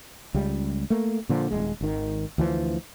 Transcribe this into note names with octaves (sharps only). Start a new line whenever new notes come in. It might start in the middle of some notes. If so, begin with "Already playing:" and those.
C#2 G3
A3 A#3
A#2 D3 F3
D#1 B1 G#3
G#1 D#3
D2 E3 F3